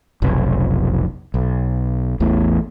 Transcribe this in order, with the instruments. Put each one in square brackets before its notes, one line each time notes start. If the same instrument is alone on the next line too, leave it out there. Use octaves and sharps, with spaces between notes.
[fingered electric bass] F1 B1
B1
A1 E2 A2